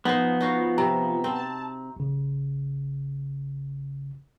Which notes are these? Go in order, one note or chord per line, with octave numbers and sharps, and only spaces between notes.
F3 B3 D#4 C5
D#4 F#4 F5
C3 A#5
C4 A5
A1 C#3